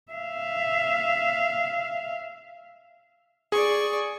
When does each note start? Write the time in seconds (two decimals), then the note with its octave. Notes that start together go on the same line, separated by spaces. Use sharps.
0.12 E5 F5
3.52 G#4 D5 C#6